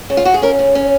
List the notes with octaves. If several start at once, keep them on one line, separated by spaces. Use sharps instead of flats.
C#3
F4
C#3 F#4
G#4
C#4 A#4
C#3
C#4